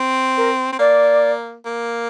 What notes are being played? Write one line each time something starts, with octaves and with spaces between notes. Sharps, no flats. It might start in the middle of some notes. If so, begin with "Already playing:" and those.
Already playing: C4
A#4
C4
A#3 D5
A#3